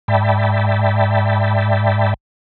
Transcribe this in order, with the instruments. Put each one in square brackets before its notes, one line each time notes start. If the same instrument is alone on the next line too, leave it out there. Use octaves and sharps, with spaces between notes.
[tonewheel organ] G#2 D5 E5 G5 A5 B5